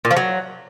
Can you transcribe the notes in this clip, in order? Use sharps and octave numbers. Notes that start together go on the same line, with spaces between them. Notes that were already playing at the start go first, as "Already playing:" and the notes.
A#2
F3
F#3